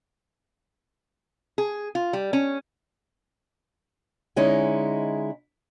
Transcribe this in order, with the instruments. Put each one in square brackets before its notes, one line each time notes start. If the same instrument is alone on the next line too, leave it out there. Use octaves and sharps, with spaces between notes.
[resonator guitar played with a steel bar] G#4
F4
G3
C#4
[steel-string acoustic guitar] D3 G#3 C#4 D#4 E4